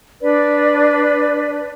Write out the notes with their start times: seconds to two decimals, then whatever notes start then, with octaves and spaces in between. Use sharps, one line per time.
0.22 D4 B4 D5